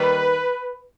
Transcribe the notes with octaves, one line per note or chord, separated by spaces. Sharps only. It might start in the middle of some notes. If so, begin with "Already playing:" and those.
Already playing: D#2 D#3 G3 B4